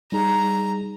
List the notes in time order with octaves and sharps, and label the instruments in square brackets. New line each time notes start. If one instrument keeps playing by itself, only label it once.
[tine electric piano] G3 D#4 G#4 [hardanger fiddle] A#5